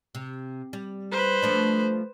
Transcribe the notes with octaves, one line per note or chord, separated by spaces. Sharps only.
C3
G3
B4 C5
F3 A3 D4